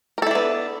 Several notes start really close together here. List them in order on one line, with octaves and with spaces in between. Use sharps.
A#4 A4 E4 D4 B3